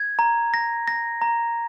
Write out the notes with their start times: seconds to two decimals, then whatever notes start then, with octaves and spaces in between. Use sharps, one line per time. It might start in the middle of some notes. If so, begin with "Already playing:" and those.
Already playing: G#6
0.19 A#5
0.54 A#6
0.88 A#6
1.22 A#5